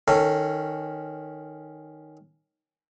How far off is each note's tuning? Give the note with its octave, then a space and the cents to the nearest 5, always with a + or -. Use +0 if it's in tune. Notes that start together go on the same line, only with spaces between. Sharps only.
D#3 +0 C#4 +0 A4 +20